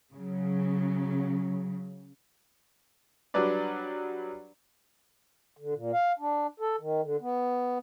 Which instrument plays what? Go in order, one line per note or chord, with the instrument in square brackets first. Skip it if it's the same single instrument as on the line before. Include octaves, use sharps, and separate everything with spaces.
[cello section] C#3 F#3
[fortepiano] F#3 G3 D4 B4 D5
[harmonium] D3
A#2
F5
D4
A4
D#3
D3
B3